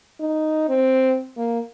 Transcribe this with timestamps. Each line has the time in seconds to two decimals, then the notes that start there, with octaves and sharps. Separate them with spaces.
0.20 D#4
0.69 C4
1.37 A#3